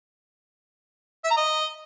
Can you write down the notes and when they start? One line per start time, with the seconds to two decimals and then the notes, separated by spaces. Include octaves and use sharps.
1.25 E5
1.31 A#5
1.37 D#5